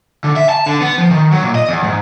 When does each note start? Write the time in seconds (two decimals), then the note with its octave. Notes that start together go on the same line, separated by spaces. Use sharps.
0.24 D3
0.36 E5
0.49 A5
0.66 D3
0.81 B3
0.98 F3
1.11 D#3
1.31 F#3
1.43 A#2
1.55 D#5
1.69 E2
1.84 G#2